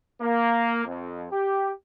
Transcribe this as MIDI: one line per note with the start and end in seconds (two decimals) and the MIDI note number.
0.22 0.85 58
0.85 1.27 41
1.32 1.70 67